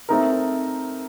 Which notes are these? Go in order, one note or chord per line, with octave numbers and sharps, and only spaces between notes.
A3 C4 D#4 A#4